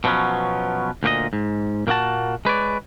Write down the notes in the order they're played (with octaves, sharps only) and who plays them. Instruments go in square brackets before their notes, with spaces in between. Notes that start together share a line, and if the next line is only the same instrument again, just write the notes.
[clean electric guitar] B2 F3 F#3 B3 C#4
D2 A#2 G4 D#5
G#2
A#2 A#3 D4 F#4 A5
G#3 B4 C#5 D5